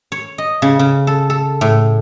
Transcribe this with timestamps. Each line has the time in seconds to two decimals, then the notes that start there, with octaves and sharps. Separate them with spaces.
0.12 C#5
0.38 D#5
0.62 C#3
0.79 C#3
1.07 A4
1.30 A4
1.61 A2